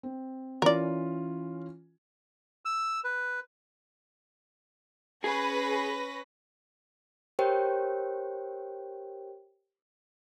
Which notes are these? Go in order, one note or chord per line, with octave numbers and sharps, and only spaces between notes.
C4
E3 C#4 F4 A#4 D5
E6
B4
C#4 G#4 B4 A#6
G4 A#4 C5 C#5 G5